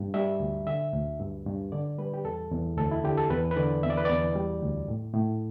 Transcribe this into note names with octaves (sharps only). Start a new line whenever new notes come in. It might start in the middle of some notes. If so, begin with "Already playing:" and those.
Already playing: G2
G3 E5
D2
D3 E5
D2
G2
G2
D3 D5
G3 B4
G4
E2 A4
E2
D2 A4
E4
D3 G4
A4
E2 B4
B4
D3 D5
E2 E5
D5
B4
E2 D5
G3
D2
A2
A2